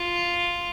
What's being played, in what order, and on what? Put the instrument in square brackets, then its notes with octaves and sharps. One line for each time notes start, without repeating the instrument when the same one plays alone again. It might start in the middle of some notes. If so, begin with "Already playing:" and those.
Already playing: [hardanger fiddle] F4